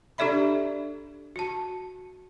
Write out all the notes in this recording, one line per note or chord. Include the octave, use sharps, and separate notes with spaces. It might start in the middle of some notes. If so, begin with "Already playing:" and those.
D4 G4 A4 D5 E5 B5
F#4 A5